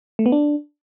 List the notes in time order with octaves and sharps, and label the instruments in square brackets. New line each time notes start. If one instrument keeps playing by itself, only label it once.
[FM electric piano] A3
B3
D4